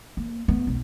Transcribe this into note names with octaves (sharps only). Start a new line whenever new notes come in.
A#3
A3 B3
B1